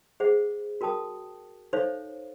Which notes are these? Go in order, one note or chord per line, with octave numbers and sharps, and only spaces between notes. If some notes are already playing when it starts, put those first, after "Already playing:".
G#4 C5 E5 F#5
F#4 A#4 G5 A5 D#6
D#4 A4 C5 C#5 E5 F5